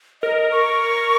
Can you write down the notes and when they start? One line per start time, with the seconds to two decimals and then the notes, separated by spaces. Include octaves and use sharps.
0.22 A#4 D#5
0.52 C#6